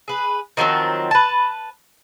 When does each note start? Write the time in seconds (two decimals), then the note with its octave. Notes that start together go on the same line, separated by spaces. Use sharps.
0.08 G#4 B4
0.57 D#3 F3 F#3 C4
1.11 B4 A5